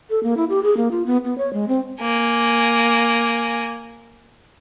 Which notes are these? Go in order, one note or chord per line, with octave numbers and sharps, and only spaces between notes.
A4
A#3
E4
G4
G#4
A#3
F4
B3
B3
C#5
G#3
C4
A#3 G#5